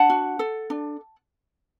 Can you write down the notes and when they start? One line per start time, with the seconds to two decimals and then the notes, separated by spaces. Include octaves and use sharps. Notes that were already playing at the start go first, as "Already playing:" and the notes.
Already playing: D4 F#5 A5
0.10 F#4
0.39 A4
0.70 D4